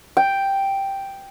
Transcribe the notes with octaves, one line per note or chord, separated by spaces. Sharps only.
G5